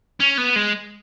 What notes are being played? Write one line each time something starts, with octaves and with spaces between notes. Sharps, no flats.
C#4
B3
G#3